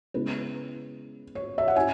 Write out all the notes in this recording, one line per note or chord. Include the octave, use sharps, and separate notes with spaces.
C#3 G#3 B3 E4 B4
C#5
E5
F#5
C#4 E4 E5 G#5